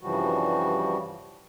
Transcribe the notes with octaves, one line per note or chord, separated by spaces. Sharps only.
G2 C#3 E3 F3 G3 F#4